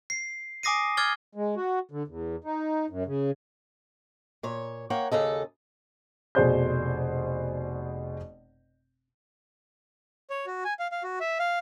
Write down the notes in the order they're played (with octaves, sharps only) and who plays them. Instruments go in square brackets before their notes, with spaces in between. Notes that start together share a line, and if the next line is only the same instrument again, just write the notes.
[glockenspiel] C7
G#5 D6 D#6 A#6 C7 D#7
D6 F6 G#6 A6 G7
[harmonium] G#3
F#4
D3
E2
D#4
F#2
C#3
[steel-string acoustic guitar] A#2 C#5
A#3 C#5 F#5 G5
D#2 C#3 A4 D#5
[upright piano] F1 B2 G#4 C5 D5 G6
[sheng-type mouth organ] C#5
F#4
G#5
F5
F5
F#4
E5
F5